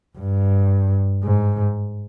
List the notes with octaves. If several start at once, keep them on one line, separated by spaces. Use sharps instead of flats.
G2
G#2